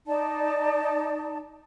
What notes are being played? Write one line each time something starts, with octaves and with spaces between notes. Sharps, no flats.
D#4 D5 A5